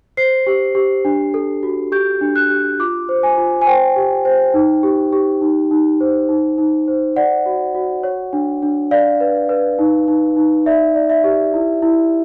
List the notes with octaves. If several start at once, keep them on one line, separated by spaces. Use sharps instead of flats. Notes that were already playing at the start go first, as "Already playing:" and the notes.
C5 C7
G4
G4
D4
A4
F#4
G4 G6
D4
F#6
G4
F4 D6
C5
G#5
F4
G#5
C5 G5
G4
C5
D#4
G4
G4
D#4
D#4
C5
D#4
D#4
C5
D5 F#5
F#4
F#4
C#5
D4
D4
D5 F5
B4
B4
D#4
D#4
D#4
D5 E5
D5
E5
G4
E4
E4